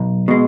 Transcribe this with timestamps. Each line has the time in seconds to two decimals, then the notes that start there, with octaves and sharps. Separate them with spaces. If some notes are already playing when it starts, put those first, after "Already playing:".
Already playing: B1
0.28 B2 G#3